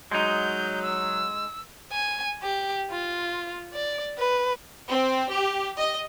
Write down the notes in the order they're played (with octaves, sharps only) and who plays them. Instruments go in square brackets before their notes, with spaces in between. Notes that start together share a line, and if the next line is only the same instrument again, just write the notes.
[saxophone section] F#3 [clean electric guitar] G#3 D#4 [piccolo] G6
[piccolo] E6
[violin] G#5
G4
F4
D5
B4
[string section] C4
G4
D#5